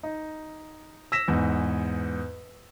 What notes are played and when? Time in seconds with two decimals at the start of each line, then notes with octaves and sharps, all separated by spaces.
0.03 D#4
1.12 E6 A#6 B6 E7
1.28 E2 G#2